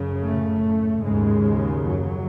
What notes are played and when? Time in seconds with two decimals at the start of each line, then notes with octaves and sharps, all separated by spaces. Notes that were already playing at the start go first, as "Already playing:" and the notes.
Already playing: F#2 C#3
0.21 A2 A3
1.02 D#2 G#2 C#3 G#3
1.84 F#2 F#3